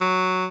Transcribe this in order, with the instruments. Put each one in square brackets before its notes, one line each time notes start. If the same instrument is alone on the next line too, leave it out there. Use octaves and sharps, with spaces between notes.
[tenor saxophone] F#3